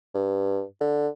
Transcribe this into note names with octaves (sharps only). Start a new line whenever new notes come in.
G2
D3